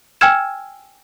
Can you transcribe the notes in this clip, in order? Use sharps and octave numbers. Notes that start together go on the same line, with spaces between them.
G5 G#5 E6 F6 G#6 E7